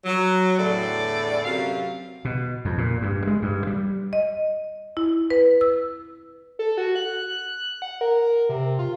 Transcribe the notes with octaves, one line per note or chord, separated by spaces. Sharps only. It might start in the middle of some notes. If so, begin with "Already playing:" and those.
F#3
E2 A2 D3 A4 D5
F#2 C3 F#3 F5
B2
F2
A#2
G2
G#3
G2
G3
D#5
E4
B4
E6
A4
F#4
F#6
F#6
F#5
A#4
C3
F4